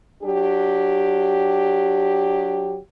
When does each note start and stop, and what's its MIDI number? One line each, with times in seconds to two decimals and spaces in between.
0.23 2.78 54
0.23 2.78 62
0.23 2.78 67